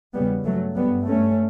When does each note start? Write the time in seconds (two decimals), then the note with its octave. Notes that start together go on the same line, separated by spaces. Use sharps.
0.15 E2 C#3 G3 B3
0.45 G2 F#3 A3
0.76 G2 G3 B3
1.08 G2 A3 C#4